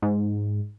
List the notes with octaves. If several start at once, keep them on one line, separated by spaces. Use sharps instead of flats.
G#2